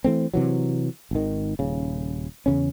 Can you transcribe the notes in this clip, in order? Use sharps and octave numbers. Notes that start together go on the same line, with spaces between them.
E3 A3 C4
C3 E3 F#3
G#1 D#3
D#1 C#3
E2 C#3 C#4